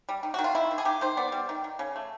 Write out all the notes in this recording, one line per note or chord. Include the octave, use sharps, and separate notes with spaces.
G3
D#3
D#3 F#4
F4
D#3 E4
D#3
G#4
D#3 G4
D#3 C5
B3 D5
G3
D#3
D#3
C#3
A3